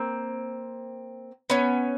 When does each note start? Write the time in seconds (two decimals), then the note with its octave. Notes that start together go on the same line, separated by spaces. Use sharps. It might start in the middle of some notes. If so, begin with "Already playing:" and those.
Already playing: A#3 C4
1.50 B3 C#4